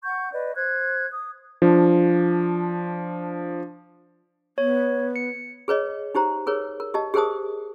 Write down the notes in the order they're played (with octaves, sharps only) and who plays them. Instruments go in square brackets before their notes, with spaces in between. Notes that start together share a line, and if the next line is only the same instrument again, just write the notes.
[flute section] F#5 C#6 G6
B4 D5 D#5
C5 F#6 G#6
D#6
[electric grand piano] F3 D4
[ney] B3 [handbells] C#5
[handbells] C#7
[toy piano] G#4 B4 C#5 D#5
D#4 G4 C5 A#5
G#4 A#4 B4 C#5
A#4
G4 D#5 A5
G4 G#4 A#4 C5 A5 D#6